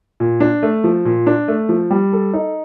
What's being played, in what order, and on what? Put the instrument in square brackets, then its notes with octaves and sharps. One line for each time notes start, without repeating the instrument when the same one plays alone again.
[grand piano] A#2
D4
A3
F3
A#2
D4
A3
F3
G3
A4
D#4